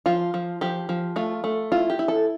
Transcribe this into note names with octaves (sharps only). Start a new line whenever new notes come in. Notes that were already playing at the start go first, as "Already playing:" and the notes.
F3 F4
F3
F3 G4
F3
A3 F4
A3
E4 F4
G4
E4
A4